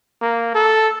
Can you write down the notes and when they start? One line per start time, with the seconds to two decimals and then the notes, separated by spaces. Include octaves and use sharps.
0.22 A#3
0.55 A4